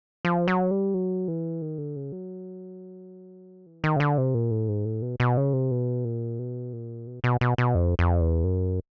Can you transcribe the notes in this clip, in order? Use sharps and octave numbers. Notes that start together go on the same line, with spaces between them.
F3
F#3
G3
F#3
E3
D#3
D3
C#3
F#3
E3
D#3
C#3
D3
C3
A#2
A2
G#2
A2
B2
B2
C#3
C3
B2
A#2
B2
A#2
B2
B2
B2
B2
F2
F2
E2
F#2